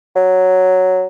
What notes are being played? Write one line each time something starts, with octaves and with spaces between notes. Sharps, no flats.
F#3